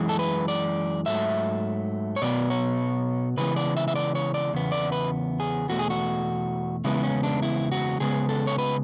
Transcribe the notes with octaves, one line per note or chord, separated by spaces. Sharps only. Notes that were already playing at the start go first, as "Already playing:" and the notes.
Already playing: F#2 E3 G#3
A4
B4
D5
G#2 F#3 A3 E5
C#5
B2 F#3 B3 D5
C#5
C#3 E3 G#3 B3 B4
D5
E5
E5
D5
C#5
D5
E2 C#3 B3
D5
B4
G#4
E2 B2 A3 F#4
G#4
F#4
E2 C#3 G#3 B3 E4
C#4
D4
E4
F#4
C#3 G#3 B3 G#4
A4
C#5
B4